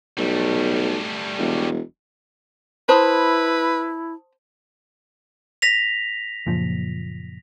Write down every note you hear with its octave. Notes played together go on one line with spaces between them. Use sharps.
B1 G3 A3
E1
E4 B4 C5 A5 D#6
A#6 B6 F7
F#1 A#2 F3